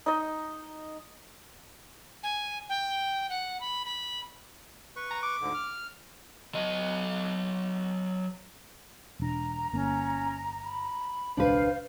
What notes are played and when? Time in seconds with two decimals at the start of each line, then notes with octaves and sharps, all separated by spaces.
0.06 D#4 D#5
2.23 G#5
2.69 G5
3.29 F#5
3.61 B5
3.85 B5
4.96 B4 C#6
5.11 A#5
5.23 D6
5.41 D2 G#2 D3
5.54 F6
6.55 F#3 D#5
9.20 E1 D4 A#5
9.73 G1 A#3 C#4
10.63 B5
11.37 E1 C#2 D4 B4 C5 F5